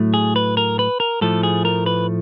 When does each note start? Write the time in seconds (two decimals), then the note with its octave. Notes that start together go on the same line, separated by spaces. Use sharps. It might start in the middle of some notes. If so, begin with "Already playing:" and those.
Already playing: A2 F#3 A3
0.14 G#4
0.36 B4
0.57 A#4
0.79 B4
1.00 A#4
1.21 A2 F3 A3 A4
1.43 G#4
1.65 A#4
1.86 B4